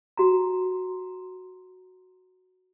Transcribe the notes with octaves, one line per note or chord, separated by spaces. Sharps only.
F#4 A#5